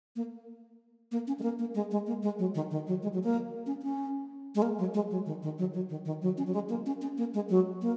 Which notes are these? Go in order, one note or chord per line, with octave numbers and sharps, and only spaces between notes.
A#3
A#3
C#4
G#3
A#3
A#3
G#3
G#3
A#3
G#3
F#3
D#3
D#3
F#3
G#3
F#3
A#3
C#4
C#4
G#3
A#3
F#3
G#3
F#3
D#3
D#3
F#3
F#3
D#3
D#3
F#3
C#4
F#3
G#3
A#3
C#4
C#4
A#3
G#3
F#3
A#3